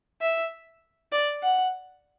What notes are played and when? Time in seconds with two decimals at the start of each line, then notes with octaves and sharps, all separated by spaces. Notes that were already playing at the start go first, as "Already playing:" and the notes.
0.21 E5
1.12 D5
1.43 F#5